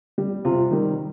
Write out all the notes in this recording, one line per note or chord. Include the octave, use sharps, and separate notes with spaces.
G3
C3 F4
D#3 G3